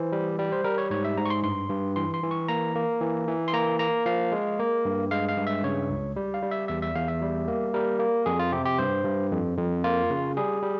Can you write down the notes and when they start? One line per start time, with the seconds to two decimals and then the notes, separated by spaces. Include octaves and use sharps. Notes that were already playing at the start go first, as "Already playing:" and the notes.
Already playing: E3 C5
0.12 G3
0.39 G3
0.52 C5
0.64 G3 A#4
0.78 C#5
0.90 G#2 C#5
1.05 E5
1.17 G#2 A#5
1.25 C#6
1.30 C6
1.43 G2 C6
1.69 G2
1.96 E3 C6
2.14 C6
2.23 E3
2.31 C#6
2.48 A#3 A#5
2.75 A#3
3.01 E3
3.28 E3
3.48 C6
3.53 A#3 A#5
3.79 A#3 A#5
4.06 F3 F5
4.32 G#3
4.59 A#3
4.85 G2
5.11 G#3 F5
5.28 F5
5.37 G2
5.47 E5
5.63 C#3 C#5
5.90 C#2
6.16 G3
6.34 F5
6.42 G3
6.51 E5
6.68 E2 E5
6.82 E5
6.95 E2 F5
7.08 E5
7.21 G3
7.48 A#3
7.74 G3 A#4
8.00 A#3
8.26 F2 G#4
8.39 F4
8.52 C3 G4
8.65 G4
8.79 G2 C5
9.05 G2
9.31 F2
9.58 F2
9.84 A#3 F4
10.10 C#3
10.37 G3 G#4
10.63 G3